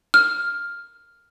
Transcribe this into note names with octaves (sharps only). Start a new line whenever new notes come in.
F6